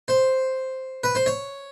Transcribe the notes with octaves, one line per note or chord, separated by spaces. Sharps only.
C5
B4
C5
C#5